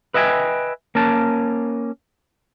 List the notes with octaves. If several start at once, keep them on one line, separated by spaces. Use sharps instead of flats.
B4 D#5 E5 G5 G#5
A#3 C#4 A5